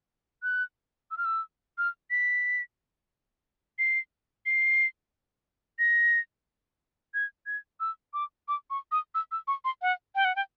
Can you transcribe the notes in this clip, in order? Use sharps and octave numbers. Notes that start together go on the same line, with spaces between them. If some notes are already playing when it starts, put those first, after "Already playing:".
F#6
E6
F6
E6
F6
B6
C7
C7
A#6
G#6
G#6
E6
D6
D6
C#6
D#6
E6
E6
C#6
C6
F#5
G5
F#5
G5